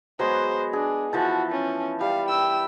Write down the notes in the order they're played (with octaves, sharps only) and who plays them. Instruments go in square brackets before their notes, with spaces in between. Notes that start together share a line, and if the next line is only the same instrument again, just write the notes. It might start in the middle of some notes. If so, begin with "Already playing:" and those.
[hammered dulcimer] F#3 G#3 B3 [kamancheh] C5
[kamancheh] D4 [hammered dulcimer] G#4
[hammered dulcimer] E3 F3 A5 [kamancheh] F#4
[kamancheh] C#4
[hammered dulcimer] G3 [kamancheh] F5
[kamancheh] G5 E6